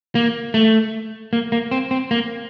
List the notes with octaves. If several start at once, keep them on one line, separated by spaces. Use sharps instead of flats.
A#3
A3
A#3
A#3
C4
C4
A#3